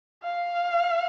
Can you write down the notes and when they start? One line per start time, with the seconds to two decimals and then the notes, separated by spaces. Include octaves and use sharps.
0.23 F5